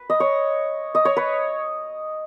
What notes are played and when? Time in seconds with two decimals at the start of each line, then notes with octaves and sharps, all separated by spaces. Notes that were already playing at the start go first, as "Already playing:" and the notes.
Already playing: B4
0.10 D#5
0.20 C#5
0.95 D#5
1.05 C#5
1.17 B4